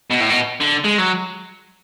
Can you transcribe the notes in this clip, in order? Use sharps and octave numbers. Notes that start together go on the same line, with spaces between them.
B2
A2
B2
D3
G#3
F#3